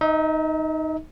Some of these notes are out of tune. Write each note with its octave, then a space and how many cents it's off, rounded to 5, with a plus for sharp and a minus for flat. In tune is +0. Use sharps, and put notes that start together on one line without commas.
D#4 +0 E5 -45